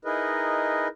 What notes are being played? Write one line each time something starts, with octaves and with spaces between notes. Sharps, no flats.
D#4 E4 G#4 A#4 B4 D#5